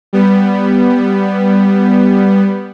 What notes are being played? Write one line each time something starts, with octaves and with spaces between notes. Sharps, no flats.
G3 B3